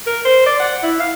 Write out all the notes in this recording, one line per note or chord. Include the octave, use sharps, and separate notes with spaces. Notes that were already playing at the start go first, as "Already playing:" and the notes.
A#4
C5
D5
F#5
E4
F5